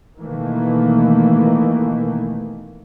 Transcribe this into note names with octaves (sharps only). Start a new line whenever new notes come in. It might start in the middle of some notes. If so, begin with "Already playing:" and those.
B2 D#3 E3 A3 A#3